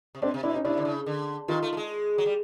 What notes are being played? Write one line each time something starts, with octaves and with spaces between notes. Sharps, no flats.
C3
B2 C4 D4
C3
B2 D4 E4
C#4 D#4
C3 D4 E4
D3
C#3
D3
D#3 D#4 F4
A3
A3
G#3
F#3
G3